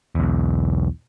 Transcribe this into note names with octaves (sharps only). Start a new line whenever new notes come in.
B1 E2